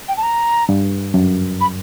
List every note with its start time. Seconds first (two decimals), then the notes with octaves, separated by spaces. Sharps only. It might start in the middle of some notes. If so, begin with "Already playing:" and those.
0.08 G5
0.17 A5
0.22 A#5
0.69 G2
1.14 F#2
1.60 B5